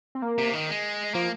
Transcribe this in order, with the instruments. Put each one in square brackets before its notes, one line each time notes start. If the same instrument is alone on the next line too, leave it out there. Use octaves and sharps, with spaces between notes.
[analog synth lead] C4
A#3
[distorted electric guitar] C3
D#3
G#3
[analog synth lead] F3 [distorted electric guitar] A#3